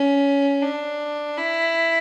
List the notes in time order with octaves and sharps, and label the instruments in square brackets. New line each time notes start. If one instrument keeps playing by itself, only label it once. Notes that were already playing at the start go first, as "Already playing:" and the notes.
Already playing: [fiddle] C#4
D4
E4